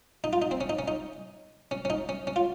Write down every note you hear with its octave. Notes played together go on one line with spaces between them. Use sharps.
D#4
F4
D#4
C4
C#4
D#4
C#4
D#4
C#4
C#4
D#4
C#4
C#4
F4